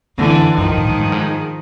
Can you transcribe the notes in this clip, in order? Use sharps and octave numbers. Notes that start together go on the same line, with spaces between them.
F#2 D3 E3
F#2
G2 D#3 F3
A2
G#2
G2
G#2